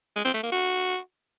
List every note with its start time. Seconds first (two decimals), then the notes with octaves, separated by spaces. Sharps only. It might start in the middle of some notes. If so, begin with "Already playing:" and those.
0.16 G#3
0.25 C4
0.34 A3
0.43 A#3
0.52 F#4